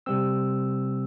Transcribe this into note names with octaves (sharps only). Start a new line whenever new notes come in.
C3 G3 C4 E6